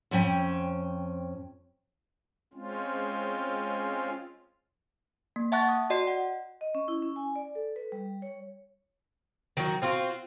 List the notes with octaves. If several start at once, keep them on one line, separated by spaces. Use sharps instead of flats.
F2 F3 C#4 G5
G#3 C4 C#4 F4
A#3
E5 F#5 A5 C#6 F#6 A6
D#6
F#4 D5 D#5 C6 C7
F#5
D#5
C#4
E4
C#4
G#5
D5
A4
B4
G3
C#5
D#3 F#3 F#4
C4 F4 F#4